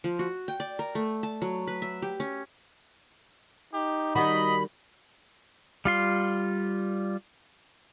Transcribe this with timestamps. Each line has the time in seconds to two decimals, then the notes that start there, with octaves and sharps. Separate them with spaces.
0.04 F3
0.19 F#4
0.48 G5
0.60 D5
0.79 A#4
0.95 A3
1.23 A5
1.42 F#3
1.68 B4
1.82 E5
2.02 G4
2.20 C#4
3.73 D#4 G4
4.15 D#3 G3 F#4 D#5 B5
5.85 G3 F4 C6